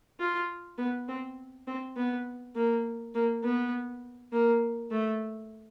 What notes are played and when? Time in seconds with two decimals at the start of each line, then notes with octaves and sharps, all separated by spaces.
0.20 F4
0.78 B3
1.08 C4
1.67 C4
1.96 B3
2.55 A#3
3.14 A#3
3.44 B3
4.32 A#3
4.91 A3